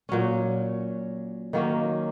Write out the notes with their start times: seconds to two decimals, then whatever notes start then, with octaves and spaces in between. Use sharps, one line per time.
0.09 A#2 F#3 C#4
1.53 D#3 F#3 A#3 C#4